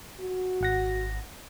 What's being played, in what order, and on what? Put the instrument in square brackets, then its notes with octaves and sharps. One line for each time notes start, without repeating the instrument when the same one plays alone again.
[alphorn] F#4
[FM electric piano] G#1 F#5 A#6